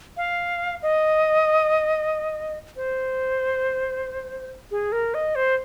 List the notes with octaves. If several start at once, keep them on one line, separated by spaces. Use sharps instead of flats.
F5
D#5
C5
G#4
A#4
D#5
C5